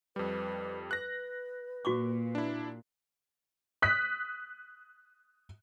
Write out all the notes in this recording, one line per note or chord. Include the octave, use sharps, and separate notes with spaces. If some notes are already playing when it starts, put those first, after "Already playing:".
F2 G3 B4
B4 F#6 A#6
A#2 F#4 C#6 D6
D4 E4
D#6 F#6 B6